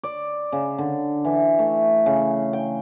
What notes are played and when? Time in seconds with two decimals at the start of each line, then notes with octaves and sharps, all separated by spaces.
0.03 D5
0.52 C#3
0.78 D3
1.25 E3
1.59 A3
2.06 C#3
2.53 G5